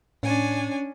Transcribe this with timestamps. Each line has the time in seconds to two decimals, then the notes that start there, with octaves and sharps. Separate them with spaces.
0.23 A2 C#4 D4 C#5 G#5